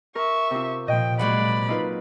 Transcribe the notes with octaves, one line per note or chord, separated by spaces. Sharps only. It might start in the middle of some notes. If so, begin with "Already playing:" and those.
A#4 E5 C#6
C3 F4
A#2 F3 D#5 G5
F#3 G#3 A#3 C5 D5 F#5 B5
D#4 F4 B4